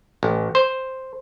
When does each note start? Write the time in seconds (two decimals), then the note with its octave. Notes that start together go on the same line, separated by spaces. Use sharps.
0.23 A1
0.55 C5